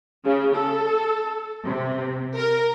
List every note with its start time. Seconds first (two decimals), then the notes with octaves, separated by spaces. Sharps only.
0.24 C#3
0.55 A4
1.66 C3
2.37 A#4